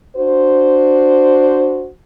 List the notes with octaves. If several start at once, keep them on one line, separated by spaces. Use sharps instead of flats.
D4 F#4 C5